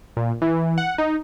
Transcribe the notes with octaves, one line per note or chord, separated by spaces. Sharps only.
A#2
E3
F#5
D#4